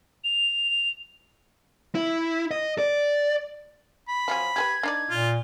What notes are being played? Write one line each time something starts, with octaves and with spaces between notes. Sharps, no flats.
F7
E4
D#5
D5
B5
F3 F#3 C#4
G4 G#4 B4 G#6
D4 D#4 D5
A#2 F4